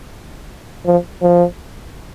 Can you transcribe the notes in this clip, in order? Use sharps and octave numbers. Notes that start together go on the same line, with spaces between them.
F3
F3